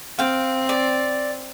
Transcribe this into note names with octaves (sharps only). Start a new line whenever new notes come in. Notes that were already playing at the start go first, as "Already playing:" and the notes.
C4 F5 G5
D5